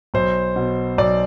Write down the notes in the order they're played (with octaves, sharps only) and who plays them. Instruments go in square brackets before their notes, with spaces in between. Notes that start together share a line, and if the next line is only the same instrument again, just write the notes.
[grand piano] B1 C5
B2
B1 D5